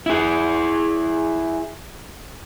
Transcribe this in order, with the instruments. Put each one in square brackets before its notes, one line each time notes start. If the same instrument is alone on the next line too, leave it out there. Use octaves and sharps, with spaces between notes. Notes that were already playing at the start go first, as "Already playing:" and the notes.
[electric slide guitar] E4 G#4